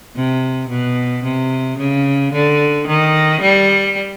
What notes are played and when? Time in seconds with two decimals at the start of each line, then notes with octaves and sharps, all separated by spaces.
0.16 C3
0.69 B2
1.24 C3
1.78 C#3
2.33 D3
2.87 D#3
3.41 G3